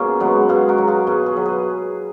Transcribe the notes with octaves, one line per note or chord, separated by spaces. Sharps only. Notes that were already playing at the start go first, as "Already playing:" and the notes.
Already playing: B2 A#3 C#4 F4 G#4
F#3 G#3 B3
B2 F4 G#4
F#4 A#4
F#3
F4 G#4
B2 G#4 B4
G#4 B4
F#3
G#4 B4